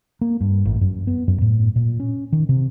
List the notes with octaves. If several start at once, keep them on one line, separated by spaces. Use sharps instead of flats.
A#3
G2
A1
F#2
B3
F#2
A2
A#2
C#4
D#3
C3